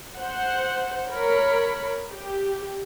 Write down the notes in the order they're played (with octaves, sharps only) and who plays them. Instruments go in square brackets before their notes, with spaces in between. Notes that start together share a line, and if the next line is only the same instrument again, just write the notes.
[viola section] C5 F#5
A#4 C#5 B5
G4